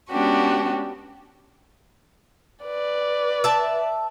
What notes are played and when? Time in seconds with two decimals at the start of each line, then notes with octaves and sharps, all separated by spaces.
0.11 G#3 B3 C#4 D4 F#4 G4
2.64 B4 D5
3.44 E5 A5